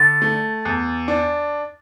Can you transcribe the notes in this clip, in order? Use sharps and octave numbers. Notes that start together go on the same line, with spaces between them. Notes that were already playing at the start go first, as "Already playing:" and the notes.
Already playing: D3 A6
A3
E2
D4